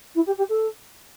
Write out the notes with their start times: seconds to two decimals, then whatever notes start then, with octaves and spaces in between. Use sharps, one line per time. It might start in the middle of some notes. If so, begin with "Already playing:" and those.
0.14 E4
0.25 G4
0.37 G4
0.48 A4